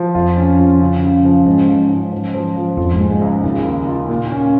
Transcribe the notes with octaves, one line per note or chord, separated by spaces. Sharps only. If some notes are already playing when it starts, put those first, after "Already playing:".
Already playing: F3
F2 F4
C#4
F4
C#3
C#3
F3
G#2 C#4
F3
C#4
F3
F3
F3
F2 F4
G#2
G#3
G#2
C#2
D#2 C#3
D#2
F4
A#2
C#4